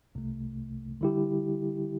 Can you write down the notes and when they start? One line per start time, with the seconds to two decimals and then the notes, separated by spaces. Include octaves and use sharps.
0.15 C2 C3 A3
1.01 D3 G3 E4 G4